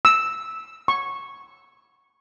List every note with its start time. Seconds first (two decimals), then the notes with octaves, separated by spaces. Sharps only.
0.05 E6
0.88 C#6